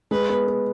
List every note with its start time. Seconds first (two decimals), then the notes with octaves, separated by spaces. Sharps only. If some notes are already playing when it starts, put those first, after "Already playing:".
0.11 G#3 B4
0.29 B3
0.47 B3